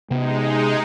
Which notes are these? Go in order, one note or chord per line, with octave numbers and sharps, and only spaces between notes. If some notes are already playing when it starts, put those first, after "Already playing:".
C3 G#3 B3 D#4